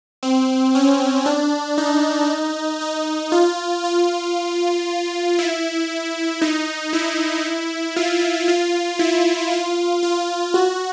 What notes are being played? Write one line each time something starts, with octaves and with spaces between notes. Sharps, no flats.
C4
C#4
D4
D#4
D#4
F4
F4
E4
D#4
E4
F4
F4
E4
F4
F4
F#4